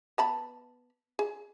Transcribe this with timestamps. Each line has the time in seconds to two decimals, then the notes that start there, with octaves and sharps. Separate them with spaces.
0.18 B3 A5 B5
1.19 G#4